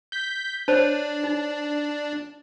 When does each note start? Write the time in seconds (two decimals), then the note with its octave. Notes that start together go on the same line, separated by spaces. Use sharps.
0.12 G6 B6
0.68 D4 C5 C#5 A5
1.24 D#4